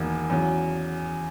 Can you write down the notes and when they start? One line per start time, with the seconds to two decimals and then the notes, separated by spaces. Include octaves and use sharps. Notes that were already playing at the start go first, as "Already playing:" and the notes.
Already playing: E1 E2 D#3 A#3
0.30 E2 C#3 F#3